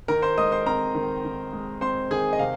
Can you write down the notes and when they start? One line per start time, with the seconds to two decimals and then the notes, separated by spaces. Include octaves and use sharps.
0.08 D#3 A#4 A#5
0.22 C5 C6
0.38 G#3 D#5 D#6
0.52 C5 C6
0.66 C4 A#4 A#5
0.95 D#3
1.25 D#3
1.53 G#3
1.81 C4 C5 C6
2.11 D#3 G#4 G#5
2.33 D#5
2.39 C3 F5